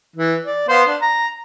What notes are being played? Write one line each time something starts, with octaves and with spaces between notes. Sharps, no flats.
E3
D5
B3 C5 F5
D4
A#5